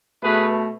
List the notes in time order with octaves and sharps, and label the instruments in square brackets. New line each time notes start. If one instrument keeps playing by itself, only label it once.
[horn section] B2 A3 G#4 B4